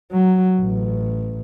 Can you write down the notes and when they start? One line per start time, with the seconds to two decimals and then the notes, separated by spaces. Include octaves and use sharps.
0.12 F#3
0.61 A1